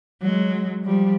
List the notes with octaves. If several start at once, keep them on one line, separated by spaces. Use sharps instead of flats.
F#3 G#3
F3 G3